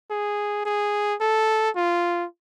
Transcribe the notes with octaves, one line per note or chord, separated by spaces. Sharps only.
G#4
G#4
A4
F4